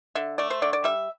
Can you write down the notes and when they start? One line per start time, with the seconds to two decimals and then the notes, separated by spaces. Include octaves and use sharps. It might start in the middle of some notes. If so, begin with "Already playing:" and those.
0.15 D3 E5
0.38 A3 D5
0.50 C5
0.62 D3 D5
0.73 D5
0.84 G3 E5